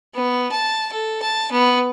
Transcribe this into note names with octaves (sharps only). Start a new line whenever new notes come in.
B3
A5
A4
A5
B3